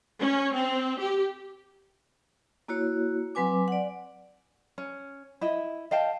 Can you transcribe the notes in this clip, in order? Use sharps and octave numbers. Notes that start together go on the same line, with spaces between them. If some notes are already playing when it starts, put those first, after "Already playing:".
C#4
C4
G4
A#3 E4 F#4 C#5
F#3 C4 B4 G#5 D6
D5 F#5
C#4
E4 D#5 E5
D#5 F5 G5 A5